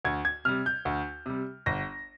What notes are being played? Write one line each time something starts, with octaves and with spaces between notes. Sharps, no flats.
D2 G#6
G#6
C3 G3 F6
G6
D2
C3 G3
G1 A#6